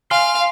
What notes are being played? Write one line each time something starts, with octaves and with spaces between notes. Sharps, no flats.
F5 G#5 C6 F6 C7 G7